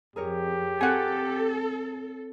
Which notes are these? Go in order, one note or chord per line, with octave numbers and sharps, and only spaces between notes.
F2 G4 G#4 A#4 C#5
C4 F4 A4 F#5 G#5